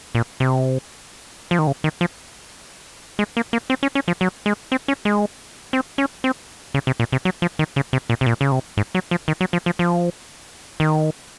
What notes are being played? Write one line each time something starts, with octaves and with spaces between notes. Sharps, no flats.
A#2
C3
F3
D#3
C#3
D#3
F3
G#3
A#3
A#3
C4
C#4
C#4
F3
F#3
G#3
C4
C#4
G#3
C4
C#4
C4
C#3
C3
A#2
C3
F#3
F3
D#3
C#3
C3
A#2
C3
A#2
C#3
C3
G#2
F#3
F3
D#3
F#3
F3
F3
F3
D#3